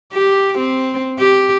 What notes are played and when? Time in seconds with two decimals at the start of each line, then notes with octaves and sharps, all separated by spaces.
0.13 G4
0.59 C4
1.19 G4